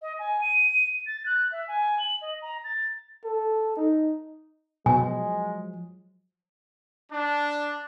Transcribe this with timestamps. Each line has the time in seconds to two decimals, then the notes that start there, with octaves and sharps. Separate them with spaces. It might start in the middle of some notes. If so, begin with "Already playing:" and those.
0.01 D#5
0.19 G#5
0.41 D#7
1.06 A6
1.25 F#6
1.51 E5
1.67 G#5
1.99 F#7
2.21 D#5
2.42 A#5
2.64 A6
3.24 A4
3.77 D#4
4.86 B2 F3 F#3 G#3 G#5
7.11 D4